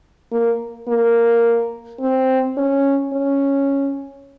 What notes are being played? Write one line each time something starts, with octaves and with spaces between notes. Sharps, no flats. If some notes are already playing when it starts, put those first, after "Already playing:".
A#3
A#3
C4
C#4
C#4